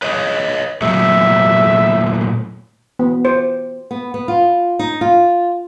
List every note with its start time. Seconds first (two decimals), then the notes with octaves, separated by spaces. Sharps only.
0.02 B4 C#5 D#5
0.82 A#2 F#3 A3 E5
2.99 B3
3.25 C5
3.91 B3
4.14 B3
4.28 F4
4.79 D#4
5.01 F4